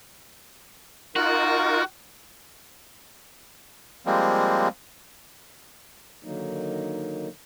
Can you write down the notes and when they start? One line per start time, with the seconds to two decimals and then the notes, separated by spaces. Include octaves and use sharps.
1.16 D#4 F4 F#4 A#4
4.06 F3 G3 G#3 A#3 C4
6.24 D3 D#3 F#3 A#3 D#4